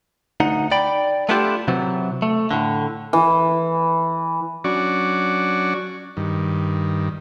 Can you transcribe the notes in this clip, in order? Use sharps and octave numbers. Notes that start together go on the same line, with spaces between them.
D2 D#4 F#5
D5 G5 B5
A3 B3 D4 E4 F4 G4
C3 E3 F#3
A3
A2 D3
E3
F#3 C#4 D4 F#4 D5 C#6
G2 D#3